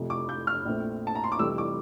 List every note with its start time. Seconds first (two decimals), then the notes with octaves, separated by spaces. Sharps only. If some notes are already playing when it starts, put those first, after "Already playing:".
Already playing: F1 F2 C3 F3
0.10 D6
0.29 G6
0.47 F6
0.65 A#1 A#2 A3 C4
1.07 A5
1.15 A#5
1.24 C6
1.32 D6
1.39 F1 F2 E3 G3 E6
1.58 D6